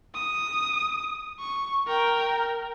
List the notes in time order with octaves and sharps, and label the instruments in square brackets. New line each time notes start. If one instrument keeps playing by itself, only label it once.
[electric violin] D#6
C#6
A#4 G5